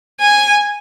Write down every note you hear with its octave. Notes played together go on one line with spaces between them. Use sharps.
G#5